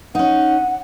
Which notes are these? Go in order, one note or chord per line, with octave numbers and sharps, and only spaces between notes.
C#4 D#4 F#5